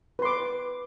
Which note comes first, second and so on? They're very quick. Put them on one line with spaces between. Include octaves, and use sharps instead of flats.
B4 C6 D6